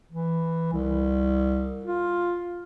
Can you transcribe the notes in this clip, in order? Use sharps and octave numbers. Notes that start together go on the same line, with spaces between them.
E3
C2
F4